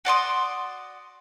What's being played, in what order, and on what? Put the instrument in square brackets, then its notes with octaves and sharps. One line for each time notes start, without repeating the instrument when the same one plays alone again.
[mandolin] F#4 D5 C6 D#6